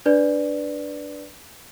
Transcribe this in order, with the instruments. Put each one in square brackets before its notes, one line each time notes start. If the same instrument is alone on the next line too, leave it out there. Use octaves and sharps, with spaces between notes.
[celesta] D4 B4 D5